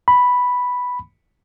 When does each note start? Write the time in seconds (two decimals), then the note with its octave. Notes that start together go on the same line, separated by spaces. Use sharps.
0.08 B5